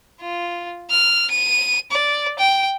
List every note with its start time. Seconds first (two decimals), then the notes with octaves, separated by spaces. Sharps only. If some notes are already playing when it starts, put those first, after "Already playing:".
0.21 F4
0.91 F6
1.31 D#7
1.91 D5
2.39 G5